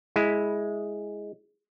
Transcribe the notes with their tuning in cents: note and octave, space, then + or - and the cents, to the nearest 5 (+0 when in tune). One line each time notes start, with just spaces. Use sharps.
G#3 +0 E4 -5